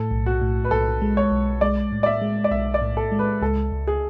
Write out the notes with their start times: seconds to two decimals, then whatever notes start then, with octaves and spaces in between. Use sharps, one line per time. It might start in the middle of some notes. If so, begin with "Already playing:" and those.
Already playing: A2 A4
0.11 B1
0.26 F#4
0.42 A2
0.65 B4
0.71 B1 A4
1.02 G#3
1.17 C#5
1.31 B1
1.61 G#3 D5
1.92 A2
2.03 D5
2.06 E5
2.22 G#3
2.44 D5
2.51 B1 E5
2.74 D5
2.82 A2
2.97 A4
3.12 G#3
3.19 B4
3.42 C#2 A4
3.72 C#2
3.87 G#4